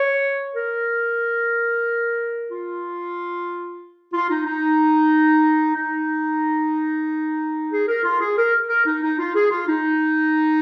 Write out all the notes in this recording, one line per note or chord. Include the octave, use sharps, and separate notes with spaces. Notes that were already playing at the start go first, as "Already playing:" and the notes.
Already playing: C#5
A#4
F4
F4
D#4
D#4
D#4
G#4
A#4
F4
G#4
A#4
A#4
D#4
D#4
F4
G#4
F4
D#4